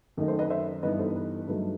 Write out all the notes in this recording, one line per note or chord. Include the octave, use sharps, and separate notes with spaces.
F#2 D#3 A3 D#4
A4 C5
B4 D#5
C5 E5
G2 E3 B3 D#4 B4 D#5
A4 C5
B4
G2 F#3 A3 D#4 B4